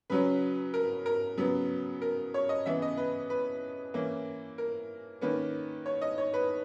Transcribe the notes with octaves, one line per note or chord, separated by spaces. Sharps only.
C#3 F#3 C#4 B4
A#4
A#4
C#3 F#3 B3
A#4
C#5
D#5
C#3 E3 B3 E5
D#5
B4
B4
E3 A#3 C#4
A#4
D#3 A#3 C#4 B4
C#5
D#5
C#5
B4